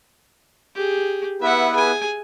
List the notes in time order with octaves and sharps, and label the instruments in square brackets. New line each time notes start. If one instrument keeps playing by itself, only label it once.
[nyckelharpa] G4 G#4
[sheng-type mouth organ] B3 E4 B4 [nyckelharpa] E5 F#5
[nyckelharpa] G#4 G#5